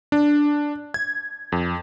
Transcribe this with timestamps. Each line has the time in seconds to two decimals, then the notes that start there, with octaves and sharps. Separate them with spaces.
0.12 D4
0.94 G#6
1.52 F2